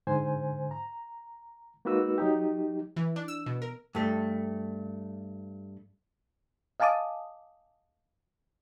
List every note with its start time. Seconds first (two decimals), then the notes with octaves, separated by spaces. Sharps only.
0.07 G#2 D3 C5 G#5
0.71 A#5
1.85 G#3 A#3 D#4 F#4 B4 E6
2.18 F#3 D#4 G4
2.96 E3
3.16 D4
3.28 E6
3.46 B2
3.62 A#4
3.95 G2 A3
6.80 D#5 F5 G#5 A5 D6 D#6